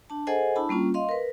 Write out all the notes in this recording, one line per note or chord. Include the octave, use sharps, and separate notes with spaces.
D4 A5
G#4 A4 C5 D#5 F#5 G#5
D4 E4 A5 B5
G3 A#3 C#4 F4
D#5 F5 C6
A#4 B4